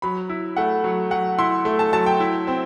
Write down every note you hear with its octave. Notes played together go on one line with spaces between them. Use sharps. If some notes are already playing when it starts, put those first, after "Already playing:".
F#3 B5
E4
A3 F#5
F#3
F#3 F#5
E4 C6
A3
A5
F#3 A5
G5
E4
C4